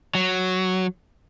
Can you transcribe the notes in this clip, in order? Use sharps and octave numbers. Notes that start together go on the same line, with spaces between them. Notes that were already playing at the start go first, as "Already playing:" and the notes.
F#3